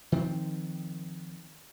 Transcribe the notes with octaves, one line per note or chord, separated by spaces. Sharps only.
D#3 F3 C4